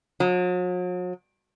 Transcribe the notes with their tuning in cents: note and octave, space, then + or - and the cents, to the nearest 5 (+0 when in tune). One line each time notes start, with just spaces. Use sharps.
F#3 -45